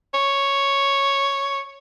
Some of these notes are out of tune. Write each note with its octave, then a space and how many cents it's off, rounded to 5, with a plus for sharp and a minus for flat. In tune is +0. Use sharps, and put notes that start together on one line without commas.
C#5 +0